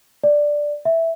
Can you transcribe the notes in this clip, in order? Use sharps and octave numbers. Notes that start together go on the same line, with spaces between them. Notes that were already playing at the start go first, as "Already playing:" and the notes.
D5
E5